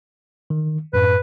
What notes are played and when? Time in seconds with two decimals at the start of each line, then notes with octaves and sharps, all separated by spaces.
0.50 D#3
0.93 F#2 A2 B4